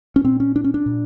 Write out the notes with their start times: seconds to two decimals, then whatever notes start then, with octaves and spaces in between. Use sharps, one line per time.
0.16 C#4
0.24 A#2 C4
0.40 C#4
0.56 D4
0.64 C#4
0.74 D4
0.86 A#2